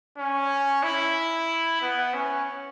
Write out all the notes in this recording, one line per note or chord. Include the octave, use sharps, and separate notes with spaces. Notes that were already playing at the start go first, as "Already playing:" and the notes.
C#4
E4
B3
C#4